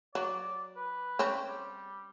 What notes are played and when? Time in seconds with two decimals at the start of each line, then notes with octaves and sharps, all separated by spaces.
0.15 F#3 D5
0.76 B4
1.19 C4 C#4
1.47 G3